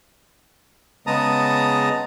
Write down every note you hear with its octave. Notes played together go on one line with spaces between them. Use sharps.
C#3 G#3 B3 A5 A#5 D#6